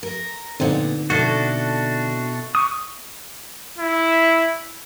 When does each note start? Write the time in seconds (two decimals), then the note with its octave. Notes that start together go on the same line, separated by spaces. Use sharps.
0.03 A#4
0.60 A#2 D3 B3 C4 D#4
1.10 B2 D4 E4 F#4 A4
2.55 C#6 D#6
3.78 E4